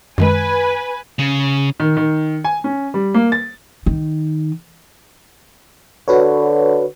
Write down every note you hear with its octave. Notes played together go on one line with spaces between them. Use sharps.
F#2 D#3 G#3 B4 G#5
C#3
D#3
D#3
G#5
C#4
G3
A#3
A6
D#3
D3 F#4 B4 C#5